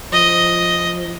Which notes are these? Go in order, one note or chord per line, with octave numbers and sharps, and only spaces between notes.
F3 D#5